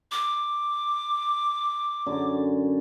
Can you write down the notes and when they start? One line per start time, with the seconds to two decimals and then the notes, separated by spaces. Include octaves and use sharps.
0.12 D6
2.06 F#2 D3 D5